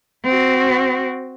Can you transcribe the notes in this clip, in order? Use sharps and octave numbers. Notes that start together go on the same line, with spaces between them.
C4 F#4